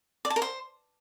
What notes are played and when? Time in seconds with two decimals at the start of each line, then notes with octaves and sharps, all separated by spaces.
0.25 D5
0.30 A5
0.36 A#4
0.42 C5